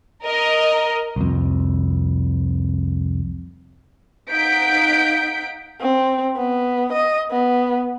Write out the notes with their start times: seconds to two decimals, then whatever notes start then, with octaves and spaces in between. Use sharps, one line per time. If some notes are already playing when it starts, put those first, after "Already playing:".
0.24 A#4 D#5
1.16 C2 F2
4.31 D#4 F5 F#5 G6 B6 D7
5.81 C4
6.37 B3
6.93 D#5
7.31 B3